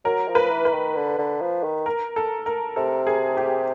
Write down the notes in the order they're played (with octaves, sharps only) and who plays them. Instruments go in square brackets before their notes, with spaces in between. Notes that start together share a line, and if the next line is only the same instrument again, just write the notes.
[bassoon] F#3 [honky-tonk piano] A#4
[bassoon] F3
[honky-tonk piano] B4
[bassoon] E3
[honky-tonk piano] B4
[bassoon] D#3
D3
D3
F3
D#3
[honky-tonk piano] A#4
A4
A#4
[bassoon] C3 [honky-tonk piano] A4
[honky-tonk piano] G#4
G4